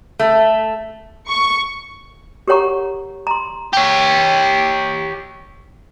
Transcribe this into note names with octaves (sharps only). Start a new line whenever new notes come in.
A3
C#6
G4 A#4 C#5 F#5 A#5 C#6
A#5 C6
G4 C#5